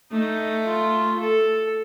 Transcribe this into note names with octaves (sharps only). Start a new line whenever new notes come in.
A3 D#4
F4
A4